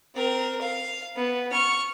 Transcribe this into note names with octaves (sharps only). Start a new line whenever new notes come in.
C4 A#4
F5
B3
C#6 F6